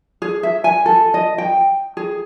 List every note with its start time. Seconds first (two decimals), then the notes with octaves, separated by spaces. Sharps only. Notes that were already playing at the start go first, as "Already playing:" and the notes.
0.22 G#4
0.43 E5
0.64 G#5
0.86 A4
1.14 D#5
1.38 G5
1.97 G#4